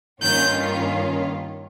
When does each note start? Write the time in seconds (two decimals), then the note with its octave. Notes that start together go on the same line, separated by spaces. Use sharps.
0.22 G2 D#3 A#3 C#4 F4 G6